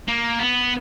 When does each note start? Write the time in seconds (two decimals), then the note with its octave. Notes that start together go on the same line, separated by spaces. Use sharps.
0.08 A#3
0.39 B3